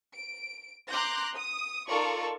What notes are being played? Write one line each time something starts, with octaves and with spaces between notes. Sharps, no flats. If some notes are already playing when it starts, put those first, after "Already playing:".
D7
A#5 C6 D6 F#6 G6 A#6
D#6
D#4 F4 A4 A#4 D5 C#6